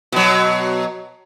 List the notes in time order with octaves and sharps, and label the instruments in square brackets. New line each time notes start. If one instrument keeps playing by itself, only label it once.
[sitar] B2 F#3